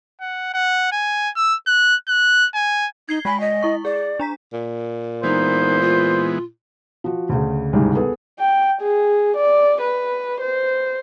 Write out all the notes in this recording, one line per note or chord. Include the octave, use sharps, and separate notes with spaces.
F#5
F#5
G#5
E6
F#6
F#6
G#5
D#4 G#6 C7 G7
G#3 G#5 B5 B6
D#5
E4 C#6
G#4 D5
D4 A#5 B6
A#2
E3 G#3 B3 D#4 C5
F4
F3 F#4
D2 C#3
C2 G#2
B3 G#4 A4
G5
G#4
D5
B4
C5